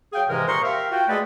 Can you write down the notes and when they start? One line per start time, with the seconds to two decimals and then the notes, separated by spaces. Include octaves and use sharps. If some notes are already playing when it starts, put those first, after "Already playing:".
0.13 F#3 G#4 F5 G5
0.28 G#2 C3 E3 G#3 A#4
0.47 A#2 C5 A#5 C6 C#6 D#6
0.63 G4 A#4 E5 F5
0.91 F4 F#4 G5
1.08 G#3 A3 G#4 A4 B4 D5